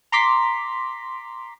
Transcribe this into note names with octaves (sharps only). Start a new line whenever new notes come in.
A#5 C6 D6 B6